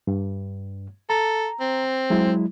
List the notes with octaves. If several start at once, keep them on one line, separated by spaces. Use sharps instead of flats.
G2
A4 A#5
C4
F#3 G#3 E4